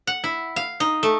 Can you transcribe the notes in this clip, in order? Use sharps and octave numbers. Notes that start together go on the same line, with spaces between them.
F#5
E4
F5
D#4
A3